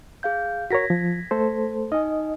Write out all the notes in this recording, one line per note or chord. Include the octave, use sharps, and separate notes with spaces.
G#4 F5 G6
F#4 A#4 C#5 G#6 A#6 B6
F3
A3 A4 C5
D#4 D#5 G#5